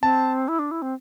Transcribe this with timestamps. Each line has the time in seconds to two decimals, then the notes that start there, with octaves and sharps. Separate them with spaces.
0.02 C4 A5
0.48 E4
0.59 D4
0.71 E4
0.82 C4